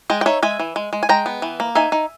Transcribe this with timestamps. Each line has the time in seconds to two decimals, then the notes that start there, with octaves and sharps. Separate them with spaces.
0.10 G#3 D#5 G5
0.21 G5
0.26 D#4 C#5 E5
0.43 G#3 E5 G#5
0.59 E3
0.76 G#3
0.93 G#3
1.03 G#5
1.09 G#3 G5 A#5
1.26 B3
1.42 E3
1.60 A#3
1.75 D#4 E5 G#5
1.92 D#4